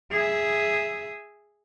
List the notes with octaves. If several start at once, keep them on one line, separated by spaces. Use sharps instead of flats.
G#4 E5